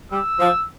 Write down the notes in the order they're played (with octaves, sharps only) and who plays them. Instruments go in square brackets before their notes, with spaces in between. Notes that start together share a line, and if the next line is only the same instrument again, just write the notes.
[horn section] G3 [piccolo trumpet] E6
[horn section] F3